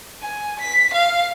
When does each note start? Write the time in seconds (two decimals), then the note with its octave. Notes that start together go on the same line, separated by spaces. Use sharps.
0.21 G#5
0.59 B6
0.93 F5